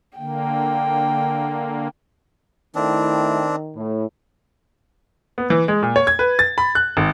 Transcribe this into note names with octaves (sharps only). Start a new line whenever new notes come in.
D3 A#3 G5
D#3 A3 C4 D4 E4
A2
B3
E3
G#3
A#2
C#5
G#6
B4
A6
B5
F#6
G#1